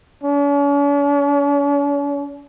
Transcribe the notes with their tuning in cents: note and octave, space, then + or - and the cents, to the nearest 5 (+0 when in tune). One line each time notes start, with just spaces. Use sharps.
C#4 +45